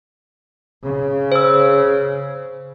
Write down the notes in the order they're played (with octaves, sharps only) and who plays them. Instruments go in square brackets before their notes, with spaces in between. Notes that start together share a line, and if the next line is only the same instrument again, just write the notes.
[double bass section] C#3
[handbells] C5 E6